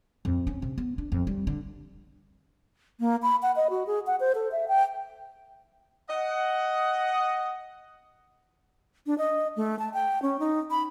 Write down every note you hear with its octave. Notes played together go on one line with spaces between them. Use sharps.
F2
C#4
C3
B3
D4
F2
G3
D3
A#3
B5
F#5
D#5
F#4
G#4
F#5
C5
A4
E5
G5
D#5 F#5
D4
D#5
A3
A5
G5
C#4
D#4
B5